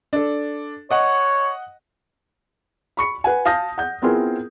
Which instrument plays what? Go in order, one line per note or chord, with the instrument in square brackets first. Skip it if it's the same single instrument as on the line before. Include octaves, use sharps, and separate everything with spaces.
[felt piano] D4 A4
[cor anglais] C#5 [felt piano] D#5 F#5
[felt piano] B5 C#6 C#7
B4 F#5 G#5
F5 A5 D#6 G6 A#6
F#5 G6
B3 C4 E4 F4 G#4 A#4